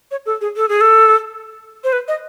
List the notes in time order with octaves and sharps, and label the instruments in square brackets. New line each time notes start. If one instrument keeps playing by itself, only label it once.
[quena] C#5
A4
G#4
A4
G#4
A4
C5
B4
D#5